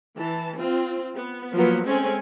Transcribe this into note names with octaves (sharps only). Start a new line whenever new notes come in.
E3 A5
C4 F4
B3
F3 F#3 A#3 B3
G#3 A3 C4 C#4 G#5